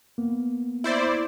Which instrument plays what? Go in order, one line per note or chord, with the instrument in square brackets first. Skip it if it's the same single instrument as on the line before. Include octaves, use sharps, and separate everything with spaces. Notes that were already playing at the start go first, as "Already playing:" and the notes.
[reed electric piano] A#3 B3
[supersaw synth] E4 C5 D5